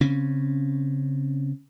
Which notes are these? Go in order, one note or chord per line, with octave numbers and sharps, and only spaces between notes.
C#3 C4 C#4